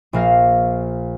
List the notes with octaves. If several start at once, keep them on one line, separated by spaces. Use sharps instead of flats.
A#1 A#3 F5 A#6